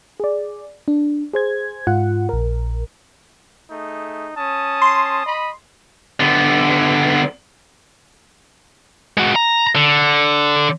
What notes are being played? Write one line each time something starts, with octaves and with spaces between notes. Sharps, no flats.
G#4 D5
D4
G#4 C5 G#6
G#2 F4 F#5
A#1 A#4
A3 D#4 G#4
C#4 A5 D#6
C6
D#5 B5
D3 B3
G#3 F#4
A#5
D3